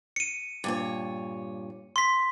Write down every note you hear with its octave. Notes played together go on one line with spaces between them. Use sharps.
C#7 D#7
G2 A#2 C#5
C6 B6